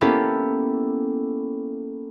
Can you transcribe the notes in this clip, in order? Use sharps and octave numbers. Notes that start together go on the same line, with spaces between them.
A#3 B3 C#4 E4 G4 A4